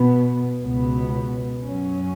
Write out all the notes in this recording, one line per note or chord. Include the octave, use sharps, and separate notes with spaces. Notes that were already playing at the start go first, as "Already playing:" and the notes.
Already playing: B2 B3
C#2 B2 B3
F#2 F#3 C#4